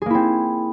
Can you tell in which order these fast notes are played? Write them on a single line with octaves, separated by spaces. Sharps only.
G#4 A#3 E4 C4